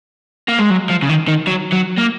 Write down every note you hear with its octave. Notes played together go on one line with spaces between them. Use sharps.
A#3
G#3
F#3
F3
C#3
D#3
D#3
F#3
F#3
A#3